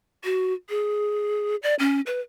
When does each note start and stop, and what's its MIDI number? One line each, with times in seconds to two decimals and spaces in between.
0.24 0.53 66
0.69 1.56 68
1.63 1.75 74
1.79 2.01 61
2.06 2.20 71